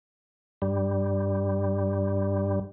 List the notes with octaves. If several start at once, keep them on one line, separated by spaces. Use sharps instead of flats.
G2 G3